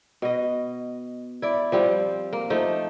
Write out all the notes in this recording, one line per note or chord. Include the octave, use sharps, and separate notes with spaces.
B2 D#5
E4 D5
F3 G3 C4
A#3
F3 A3 D#4